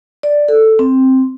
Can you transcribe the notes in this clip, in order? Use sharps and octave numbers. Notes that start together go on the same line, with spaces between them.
D5
A4
C4